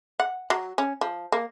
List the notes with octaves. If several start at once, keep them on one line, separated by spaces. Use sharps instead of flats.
F#5
F#3
C#4
F3
A#3